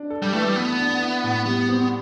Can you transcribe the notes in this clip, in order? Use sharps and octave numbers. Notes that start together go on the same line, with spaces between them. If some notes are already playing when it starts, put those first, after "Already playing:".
Already playing: D4
A4
G3
E3 A3
G3
A3 B3
D4
E4
A2
G3 B3
C4